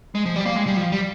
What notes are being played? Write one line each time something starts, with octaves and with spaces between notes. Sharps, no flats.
G#3
F3
G3
A#3
G#3
G3
F3
G3